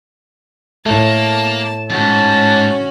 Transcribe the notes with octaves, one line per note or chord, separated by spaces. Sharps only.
A2 A3 A#3 A5
F2 G#2 C#4 F#4 A5